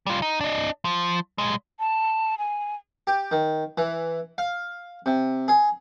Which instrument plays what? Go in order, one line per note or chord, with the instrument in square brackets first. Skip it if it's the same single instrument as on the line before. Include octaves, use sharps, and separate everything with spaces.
[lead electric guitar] G3 F4
D#4
D4 D#5
F3
B1 G#3
[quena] A5
G#5
[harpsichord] G4
D#3
E3
F5
C3
G#4